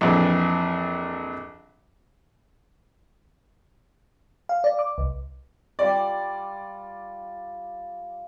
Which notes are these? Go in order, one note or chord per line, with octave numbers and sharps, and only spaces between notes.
A#1 F2 E3
F5
D5
D6
C2
G3 F4 D5